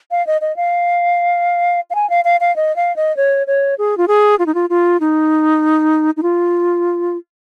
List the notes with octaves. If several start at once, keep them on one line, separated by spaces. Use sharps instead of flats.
F5
D#5
D#5
F5
F5
G#5
F5
F5
F5
D#5
F5
D#5
C#5
C#5
G#4
F4
G#4
F4
D#4
F4
F4
D#4
D#4
F4